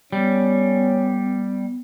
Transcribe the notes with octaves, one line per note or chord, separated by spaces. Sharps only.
G3 B3 C#4